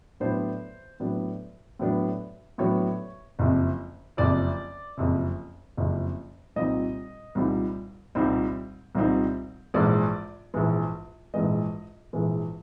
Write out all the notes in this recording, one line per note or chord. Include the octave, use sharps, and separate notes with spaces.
A2 F#3 B3 D4 C5
A2 F#3 B3 D4
A2 F#3 B3 D4
A2 F#3 B3 D4 C#5
F#1 F2 C3
F#1 F2 C3 D5
F#1 F2 C3
F#1 F2 C3
C2 A#2 G3 C4 D#4 D#5
C2 A#2 G3 C4 D#4
C2 A#2 G3 C4 D#4
C2 A#2 G3 C4 D#4
A#1 G#2 E3 G#3 D5
A#1 G#2 E3 G#3
A#1 G#2 E3 G#3 D#5
A#1 G#2 E3 G#3